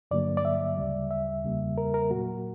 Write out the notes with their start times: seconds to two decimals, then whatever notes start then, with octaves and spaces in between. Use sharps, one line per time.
0.11 G2 D3 F#3 A#3 D5
0.37 D5
0.45 E5
0.77 D2 C#3 G3
1.11 E5
1.43 E2 C#3 G3 A#3
1.78 A#4
1.94 A#4
2.10 A#2 F#3 A#3 F#4